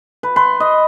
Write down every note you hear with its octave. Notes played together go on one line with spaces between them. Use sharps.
B4
B4 C6
D#5